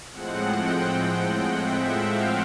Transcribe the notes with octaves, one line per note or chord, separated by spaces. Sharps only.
A2 F3 G#3 C4 F#5
G5
F#5
F#5
E5
F5